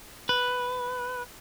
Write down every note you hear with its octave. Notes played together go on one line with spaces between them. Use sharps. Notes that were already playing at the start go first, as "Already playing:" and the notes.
B4